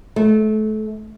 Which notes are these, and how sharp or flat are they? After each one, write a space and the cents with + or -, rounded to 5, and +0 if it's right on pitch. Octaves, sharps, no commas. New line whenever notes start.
A3 -30